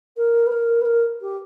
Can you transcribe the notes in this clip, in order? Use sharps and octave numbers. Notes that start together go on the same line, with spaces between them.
A#4
B4
A#4
B4
A#4
G4